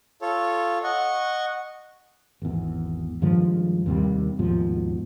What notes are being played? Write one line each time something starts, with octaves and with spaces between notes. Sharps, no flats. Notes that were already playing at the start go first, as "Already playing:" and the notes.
F4 A4 C#5
D#5 F#5 C#6
G#1 E2
G2 D#3 F3 G#3
D#2 C3 G3
D#2 G#2 B2 F3